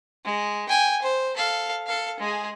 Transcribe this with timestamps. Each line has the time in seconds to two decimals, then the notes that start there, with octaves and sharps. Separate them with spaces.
0.25 G#3
0.69 G5 G#5
1.02 C5
1.36 A4 F5
1.87 A4 F5
2.20 G#3 G#4